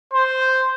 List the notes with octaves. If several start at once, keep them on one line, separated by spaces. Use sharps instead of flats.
C5